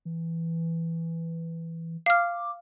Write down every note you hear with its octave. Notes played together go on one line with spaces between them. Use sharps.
E3
F5 D6 F6